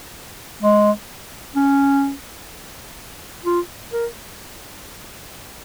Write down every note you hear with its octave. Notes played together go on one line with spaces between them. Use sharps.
G#3
C#4
F4
A#4